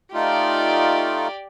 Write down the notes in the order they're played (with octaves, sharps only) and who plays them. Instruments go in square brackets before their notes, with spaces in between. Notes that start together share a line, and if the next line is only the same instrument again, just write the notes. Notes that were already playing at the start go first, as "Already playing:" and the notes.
[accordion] A3 D#4 F4 [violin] G4 D5